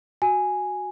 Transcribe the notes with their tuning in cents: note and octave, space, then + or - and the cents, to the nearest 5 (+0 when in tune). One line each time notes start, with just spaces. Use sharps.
F#4 +0 G#5 +0